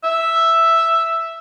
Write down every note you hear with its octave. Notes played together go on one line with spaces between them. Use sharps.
E5